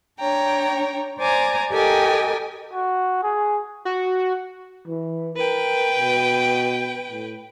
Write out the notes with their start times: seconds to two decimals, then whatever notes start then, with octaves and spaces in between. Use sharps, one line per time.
0.20 D4 C#5 G5 A#5
1.19 C5 D5 G#5 A#5 D6
1.73 G4 A4 A#4 D#5 G5 G#5
2.74 F#4
3.23 G#4
3.85 F#4
4.87 E3
5.37 A#4 B4 G5
5.98 B2
7.11 A2